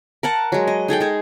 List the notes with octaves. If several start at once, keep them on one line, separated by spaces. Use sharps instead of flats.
A#4 F#5 A5
F#3 G#3
D#5
D#4 G#4 A4 G5
G#3 G#4